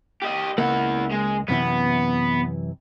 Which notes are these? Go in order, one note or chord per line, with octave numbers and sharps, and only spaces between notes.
G4 D#5
C#2 A#3 E4 F#5
G#3
F#2 C3 E3 B3